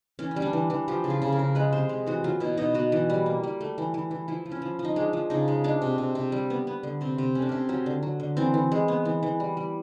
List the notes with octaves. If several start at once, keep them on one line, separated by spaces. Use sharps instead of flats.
E3 C#4
C#4
G3
D4
E3
E3
F3 G4
C#3
F4
C#3
A#4
C#3
G#3 B4
C3 C5
G#3
E3 F#4
F#3 F4
B2 E4
B2 D#4
B3 F#4
E3
G3
A#3
G3
A3
E3
E3
E3
F3 E4
F3
C#4
F3
F3
D#4
G#3 D4
F3
C#3 D#4
G#3
G#3 D4
C3
C3
C3
G3
B3
B3
D3
C3 C4
C3
A3 C#4
D4
C3 C#4
F#3 C#4
D3
F#3
D3
E3 C4
E3
G#3
B3
E3
E3
G3
G3